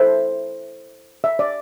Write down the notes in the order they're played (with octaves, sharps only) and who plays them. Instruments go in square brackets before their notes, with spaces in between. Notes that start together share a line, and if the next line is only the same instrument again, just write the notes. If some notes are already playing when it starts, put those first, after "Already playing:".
Already playing: [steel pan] E4 A4 C5 E5
E5
D5